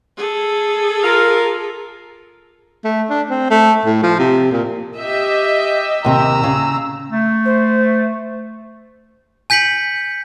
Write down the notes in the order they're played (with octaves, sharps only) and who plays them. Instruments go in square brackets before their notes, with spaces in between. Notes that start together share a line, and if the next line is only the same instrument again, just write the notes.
[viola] G#4 A4
[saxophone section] F4 A#4
[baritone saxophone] A3
D4
C4
A3
A2
F3
C3
A#2
[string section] G4 D#5 E5
[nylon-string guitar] D#2 C3 [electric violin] A#5 E6
[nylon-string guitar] C#3
[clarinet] A3
[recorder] C5
[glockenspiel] G#5 G6 B6 C#7 F#7